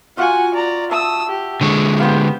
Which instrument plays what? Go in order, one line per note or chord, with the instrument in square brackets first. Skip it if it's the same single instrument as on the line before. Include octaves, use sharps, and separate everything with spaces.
[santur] F4 F#4 F5 [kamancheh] F#5 G#5
[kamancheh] D5 A#5
[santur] E5 A5 [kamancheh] D#6 E6
[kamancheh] G4
[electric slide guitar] D3 G#3 [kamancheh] C#6
[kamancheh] B3 G4 [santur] C5 F5